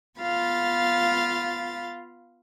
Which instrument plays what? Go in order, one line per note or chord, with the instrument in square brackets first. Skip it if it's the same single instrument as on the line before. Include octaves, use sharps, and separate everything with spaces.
[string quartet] B3 F4 F5 B5 A6